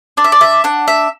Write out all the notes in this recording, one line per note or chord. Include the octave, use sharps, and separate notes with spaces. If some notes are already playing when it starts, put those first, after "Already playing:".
D4 D5
E5
D5
E5
D4 F#5
E5